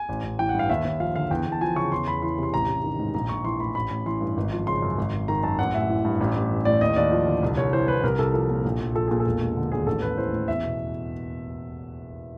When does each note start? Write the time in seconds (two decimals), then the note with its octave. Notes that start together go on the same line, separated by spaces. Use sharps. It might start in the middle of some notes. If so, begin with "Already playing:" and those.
Already playing: G#5
0.09 A1
0.23 A1
0.39 E3 G5
0.49 F#5
0.54 G2 F5
0.70 D#2 E5
0.85 D#2
1.00 F3 F5
1.16 D3 F5
1.31 E2 G5
1.46 E2
1.52 A5
1.61 F3 G#5
1.76 C#3 C#6
1.92 E2 C6
2.08 E2 B5
2.22 E3 C6
2.38 C3
2.43 C6
2.53 A1 A#5
2.68 A1
2.84 D#3
2.99 G#2
3.14 A#1 A#5
3.29 A#1 C#6
3.45 E3 C6
3.60 A2 B5
3.75 A1 B5
3.90 A1
4.06 E3 C6
4.21 G2
4.37 G#1
4.52 F3
4.67 C#3 C6
4.82 F#2
4.98 G#1
5.13 G#1
5.28 D#3 A#5
5.43 F#2 A5
5.59 A1 F#5
5.74 A1 E5
5.90 E3
6.05 G2
6.20 A1
6.36 A1
6.51 E3
6.65 A2 D5
6.81 D#2 D#5
6.96 D#2 D5
7.12 F3
7.27 D3
7.42 C2
7.57 C2 C#5
7.72 E3 C5
7.88 C3 B4
8.03 C2 A#4
8.19 C2 A4
8.34 F3 A4
8.49 A#2
8.65 A#1
8.80 A#1
8.95 F3 A4
9.07 A#2 G#4
9.20 A4
9.26 E1
9.41 E1
9.57 D3
9.71 D#2 G#4
9.87 A1 A4
10.02 A1 B4
10.17 E3 C5
10.33 A2
10.48 E2 E5
10.63 B2